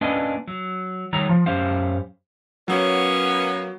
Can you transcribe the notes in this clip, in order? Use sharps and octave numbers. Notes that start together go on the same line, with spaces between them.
A#3 C#4 D4 B4 D#5 G#5
F#3
D#3 G3 C#5 A#5
F3
F#2 C#4 G4 C5 F5
F#3 A#3 B3 C#4